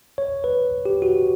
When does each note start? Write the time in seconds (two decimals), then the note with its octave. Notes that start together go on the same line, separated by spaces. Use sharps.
0.18 C#5
0.44 B4
0.86 G4
1.02 F#4